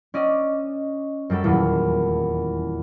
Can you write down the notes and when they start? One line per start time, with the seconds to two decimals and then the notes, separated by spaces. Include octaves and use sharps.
0.14 C#4 D5 D#5
1.30 F#2 G3 G4 A4
1.44 D#1 E2 A#2 F#3